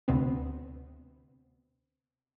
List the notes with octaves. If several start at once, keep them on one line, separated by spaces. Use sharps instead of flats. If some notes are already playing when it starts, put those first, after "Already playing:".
D2 C3 B3 C4